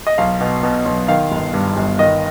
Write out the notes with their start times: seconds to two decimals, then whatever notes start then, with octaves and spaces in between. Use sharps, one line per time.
0.07 D#5
0.18 B1 F5
0.41 B2
0.63 B2
0.86 B1
1.08 D#3 F5
1.31 G1
1.54 G2
1.77 G1
1.99 D#3 D#5